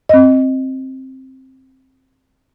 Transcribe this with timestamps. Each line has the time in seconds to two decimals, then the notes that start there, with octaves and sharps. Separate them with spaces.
0.09 C4 D#5